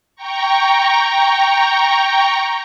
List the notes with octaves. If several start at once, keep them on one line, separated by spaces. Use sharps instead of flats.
G5 A#5 C#6